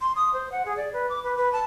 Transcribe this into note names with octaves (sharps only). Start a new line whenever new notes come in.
C6
D#6
C5
F#5
G#4
D5
B4
D6
B4
B4
A5